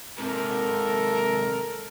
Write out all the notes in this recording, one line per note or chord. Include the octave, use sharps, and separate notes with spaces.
G#2 C3 A4 A#4